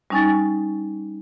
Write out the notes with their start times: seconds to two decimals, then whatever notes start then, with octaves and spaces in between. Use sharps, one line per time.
0.10 G3 C#4 D#4 G#5 C#6 A6